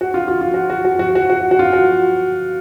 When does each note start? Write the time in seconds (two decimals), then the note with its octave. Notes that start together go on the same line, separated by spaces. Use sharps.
0.01 F#4
0.14 F4
0.28 F4
0.41 F4
0.54 F#4
0.70 F#4
0.85 F#4
0.99 F#4
1.15 F#4
1.30 F#4
1.51 F#4
1.59 F4
1.73 F#4